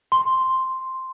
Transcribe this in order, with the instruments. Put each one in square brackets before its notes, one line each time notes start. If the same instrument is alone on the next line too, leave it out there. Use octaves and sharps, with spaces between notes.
[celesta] C6